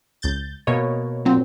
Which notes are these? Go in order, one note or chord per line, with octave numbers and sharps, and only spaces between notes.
C#2 G6 A6
B2 A#3 C#5 D#5
A#2 F#3 C4